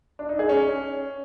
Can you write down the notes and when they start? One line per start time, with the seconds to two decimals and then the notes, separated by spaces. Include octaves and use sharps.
0.19 D4
0.29 D#4
0.39 G#4
0.49 C#4